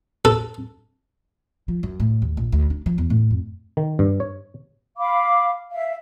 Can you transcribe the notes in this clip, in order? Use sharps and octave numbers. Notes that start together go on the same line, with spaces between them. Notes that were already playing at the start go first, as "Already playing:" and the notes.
A4
F3
F#2
A2
D#2
A#1
D2
D4
F3
E2
A2
F2
D#3
G2
C#5
F5 B5 D6
E5 F5